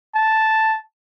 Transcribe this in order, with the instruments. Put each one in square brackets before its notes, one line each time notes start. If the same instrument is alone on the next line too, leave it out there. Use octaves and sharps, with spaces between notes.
[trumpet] A5